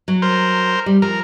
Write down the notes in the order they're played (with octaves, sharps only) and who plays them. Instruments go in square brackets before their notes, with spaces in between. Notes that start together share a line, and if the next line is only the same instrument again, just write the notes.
[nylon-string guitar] F#3
[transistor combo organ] A#4 C5
[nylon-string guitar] G3
[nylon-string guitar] F3 [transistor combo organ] A#4